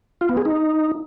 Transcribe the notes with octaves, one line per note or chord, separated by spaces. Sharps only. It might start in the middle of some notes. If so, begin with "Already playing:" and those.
F4
B3
G#4
D#4